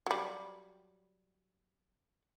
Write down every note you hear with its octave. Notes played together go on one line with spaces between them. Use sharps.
F#3 G3